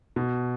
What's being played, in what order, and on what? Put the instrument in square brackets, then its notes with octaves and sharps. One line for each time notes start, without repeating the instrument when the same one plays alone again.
[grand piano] B2